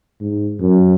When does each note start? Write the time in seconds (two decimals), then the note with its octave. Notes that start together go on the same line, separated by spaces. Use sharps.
0.21 G#2
0.61 F#2